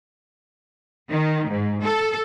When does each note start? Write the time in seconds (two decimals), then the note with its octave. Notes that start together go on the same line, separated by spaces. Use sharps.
1.09 D#3
1.49 G#2
1.84 A4